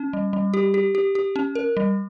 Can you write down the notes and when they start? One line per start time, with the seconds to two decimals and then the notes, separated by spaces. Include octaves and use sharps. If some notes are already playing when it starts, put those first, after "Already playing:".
Already playing: C#4
0.13 G3
0.33 G3
0.54 G4
0.74 G4
0.95 G4
1.15 G4
1.36 C#4
1.55 A#4
1.77 G3